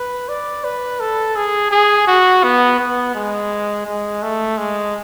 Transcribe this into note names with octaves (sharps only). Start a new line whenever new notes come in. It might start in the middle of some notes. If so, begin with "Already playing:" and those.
Already playing: B4
D5
B4
A4
G#4
G#4
F#4
B3
B3
G#3
G#3
A3
G#3